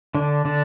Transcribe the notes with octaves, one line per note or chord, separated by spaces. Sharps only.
D3 D4
D3 D4